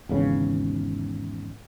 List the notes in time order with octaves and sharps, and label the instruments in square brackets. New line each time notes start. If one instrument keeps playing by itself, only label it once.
[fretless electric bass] G#1 E2 C#3